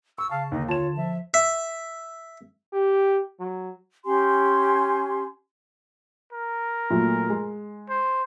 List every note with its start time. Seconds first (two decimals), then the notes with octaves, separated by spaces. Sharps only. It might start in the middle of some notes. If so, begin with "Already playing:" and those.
0.18 C#6 E6
0.31 C#3 F5 A5
0.52 D#2 D3 D#4
0.68 F4 C#5 A5 E7
0.97 F3 E5
1.34 E5
2.73 G4
3.40 F#3
4.05 C#4 G4 G#5 C6
6.33 A#4
6.90 A#2 F#3 A3
7.30 G#3
7.89 C5